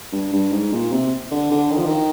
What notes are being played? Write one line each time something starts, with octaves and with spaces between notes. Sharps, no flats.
G2
G2
G#2
A#2
C3
D3
D3
D#3
F3
D#3